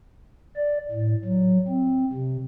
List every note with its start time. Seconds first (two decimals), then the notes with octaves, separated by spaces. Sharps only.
0.56 D5
0.91 A2
1.25 F#3
1.68 C4
2.13 C3